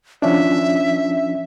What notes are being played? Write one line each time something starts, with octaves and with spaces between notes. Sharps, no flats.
F3 C#4 D4 E5